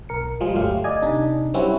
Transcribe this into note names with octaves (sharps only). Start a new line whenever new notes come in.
B1 A#4 C#7
F3 G3 G#3 F4 G#4
G1 D2 F#3 A3 G4 F5
D5 D#5 G#5
C3 D4 D#4
F#3 G3 C4 C#4 E4 F#4